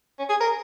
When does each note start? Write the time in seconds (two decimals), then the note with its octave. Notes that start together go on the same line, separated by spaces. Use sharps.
0.19 C#4
0.29 G#4
0.40 A#4